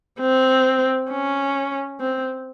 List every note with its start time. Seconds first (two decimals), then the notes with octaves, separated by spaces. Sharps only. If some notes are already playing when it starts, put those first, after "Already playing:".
0.20 C4
1.11 C#4
2.00 C4